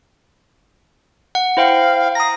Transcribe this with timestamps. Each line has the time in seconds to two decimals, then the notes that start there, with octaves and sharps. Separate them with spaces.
1.35 F#5
1.57 E4 C5 F5 G5
2.15 A#5 D#6 A#6